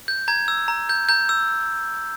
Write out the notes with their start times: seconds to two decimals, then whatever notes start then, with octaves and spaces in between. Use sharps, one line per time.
0.08 G6
0.28 A#5 G#6
0.48 E6
0.68 A#5
0.89 G6
1.09 A#5 G6
1.29 E6